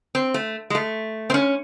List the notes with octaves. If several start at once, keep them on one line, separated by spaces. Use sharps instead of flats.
C4
A3
G#3
A3
C4
C#4